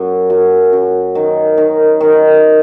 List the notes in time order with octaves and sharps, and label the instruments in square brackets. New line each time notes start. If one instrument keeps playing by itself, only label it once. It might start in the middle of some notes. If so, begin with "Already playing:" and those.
Already playing: [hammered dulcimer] F#2
F#2
F#2
D#3
D#3
D#3